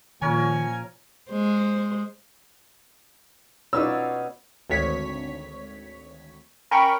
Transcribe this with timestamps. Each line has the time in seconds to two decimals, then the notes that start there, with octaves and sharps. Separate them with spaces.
0.22 A#2 D#3 F3 C#4 A#4 C#5 G#5
1.30 G#3 C5
3.73 B2 C#4 D#4 F4 C#5 D5 B5 E6
4.70 G#1 D2 C#5 B6
6.71 C#4 A#4 G5 B5 C#6